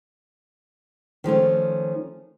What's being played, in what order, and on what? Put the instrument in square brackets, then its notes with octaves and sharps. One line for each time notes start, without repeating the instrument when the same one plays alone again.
[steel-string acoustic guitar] D#3 F3 A3 C#4